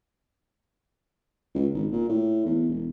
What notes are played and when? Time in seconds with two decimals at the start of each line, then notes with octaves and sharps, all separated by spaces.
1.55 C#2
1.74 G#1
1.92 A#2
2.09 A2
2.46 E2
2.69 E1